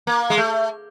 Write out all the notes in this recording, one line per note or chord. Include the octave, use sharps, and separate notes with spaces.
A#3
G#3
A3